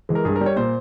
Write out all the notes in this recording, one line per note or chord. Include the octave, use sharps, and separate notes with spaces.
E3 G#3
A#4
G2 G#4
A#4
G3
C#5
A#2 C5